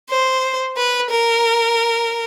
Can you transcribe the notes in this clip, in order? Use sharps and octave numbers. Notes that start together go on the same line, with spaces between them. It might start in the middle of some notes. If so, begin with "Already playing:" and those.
C5
B4
A#4